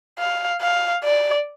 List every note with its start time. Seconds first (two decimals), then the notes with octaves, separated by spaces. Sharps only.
0.19 F5
0.61 F5
1.04 D5